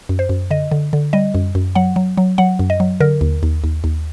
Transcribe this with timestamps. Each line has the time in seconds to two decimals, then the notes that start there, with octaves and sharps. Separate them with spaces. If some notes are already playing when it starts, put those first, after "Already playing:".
0.09 F#2
0.19 C5
0.29 F#2
0.51 D3 D#5
0.72 D3
0.93 D3
1.13 G3 D#5
1.35 F#2
1.55 F#2
1.75 F#3 F#5
1.96 F#3
2.18 F#3
2.38 F#3 F#5
2.59 F#2
2.70 D#5
2.80 F#3
3.01 D3 A#4
3.21 D#2
3.43 D#2
3.64 D#2
3.84 D#2